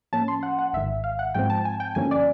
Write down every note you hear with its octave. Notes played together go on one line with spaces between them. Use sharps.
A2 F3 A#3 C#4 A5
C6
F#5
F#5
G#1 G#2 D#3 E5
F5
F#5
G#2 F3 G#3 C4 G5
A5
G#5
G5
G2 D3 F3 A#3 C#4 G#5
D5